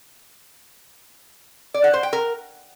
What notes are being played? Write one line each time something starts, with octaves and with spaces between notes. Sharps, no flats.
D5
F#5
C5
G5
A#4